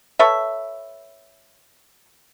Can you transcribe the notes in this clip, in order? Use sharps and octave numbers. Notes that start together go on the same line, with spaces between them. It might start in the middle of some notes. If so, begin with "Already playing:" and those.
A4 B4 C#5 E5